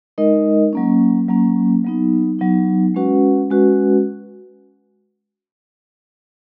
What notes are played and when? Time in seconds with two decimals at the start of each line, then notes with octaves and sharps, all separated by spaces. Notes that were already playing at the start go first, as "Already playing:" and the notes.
0.18 G#3 D#4 A#4 D#5
0.73 F#3 A#3 C#4
1.29 F#3 A#3 C#4
1.84 F#3 B3 D#4
2.39 F#3 B3 D#4
2.95 G#3 C#4 F#4 B4 F#5
3.50 G#3 C#4 F#4 B4 F#5